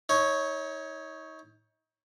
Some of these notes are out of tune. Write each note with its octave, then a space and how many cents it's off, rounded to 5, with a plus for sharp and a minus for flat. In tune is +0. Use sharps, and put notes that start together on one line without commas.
D#4 +35 C#5 +0